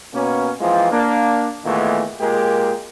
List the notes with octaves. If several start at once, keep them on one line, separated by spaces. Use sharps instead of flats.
B2 A#3 C#4
E3 F3 G#3 A#3 C4 F4
A#3 D4
E2 A#2 D#3 G#3 A3
A#2 G#3 G4 G#4 A#4